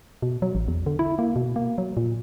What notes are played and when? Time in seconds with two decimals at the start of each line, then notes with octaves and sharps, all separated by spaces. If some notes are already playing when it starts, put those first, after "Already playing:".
0.22 B2
0.42 F#3
0.55 A1
0.68 E2
0.86 D3
0.99 E4
1.19 A#3
1.36 B2
1.56 A#3
1.78 F#3
1.97 A#2